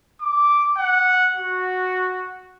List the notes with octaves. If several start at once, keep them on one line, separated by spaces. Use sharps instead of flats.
D6
F#5
F#4